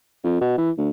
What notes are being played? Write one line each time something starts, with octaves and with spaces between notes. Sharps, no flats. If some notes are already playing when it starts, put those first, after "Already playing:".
F2
B2
E3
D2